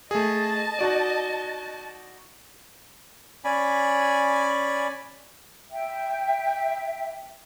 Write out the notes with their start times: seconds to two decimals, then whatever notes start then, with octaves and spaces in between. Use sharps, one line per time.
0.11 A3 G#4 D#5 A5
0.79 D#4 F#4 D5
3.44 C#4 D5 G#5 B5
5.70 E5 G5